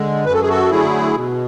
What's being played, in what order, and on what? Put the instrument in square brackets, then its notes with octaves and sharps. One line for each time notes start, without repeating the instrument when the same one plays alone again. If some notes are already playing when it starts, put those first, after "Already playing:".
Already playing: [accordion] D3 G#3
F#2 B4
A4
G#4
F#4 A4
D3 F#3 A3 E4 G#4
B2